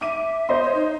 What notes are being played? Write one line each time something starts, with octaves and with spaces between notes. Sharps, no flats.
E5 D6 D#7
C5 D#5 C6
C#5
D#4